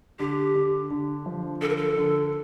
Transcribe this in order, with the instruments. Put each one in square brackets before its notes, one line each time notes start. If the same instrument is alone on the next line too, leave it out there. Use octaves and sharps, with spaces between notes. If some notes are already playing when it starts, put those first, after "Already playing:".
[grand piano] D3 [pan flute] G4
[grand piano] D3
D3
F3
[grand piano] D3 [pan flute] A4
[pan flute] A#4
A4
[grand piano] D3